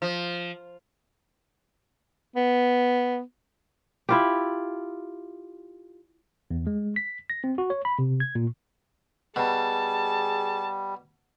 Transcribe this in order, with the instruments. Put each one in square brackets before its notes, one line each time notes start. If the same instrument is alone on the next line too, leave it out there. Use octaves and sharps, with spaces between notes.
[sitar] F3
[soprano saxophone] B3
[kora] E4 F4 G4
[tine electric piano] E2
G#3
B6
A#6
C4
F#4
C#5
B5
C3
G#6
A#2
[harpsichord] B2 [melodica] G3 [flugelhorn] G#4 [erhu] A5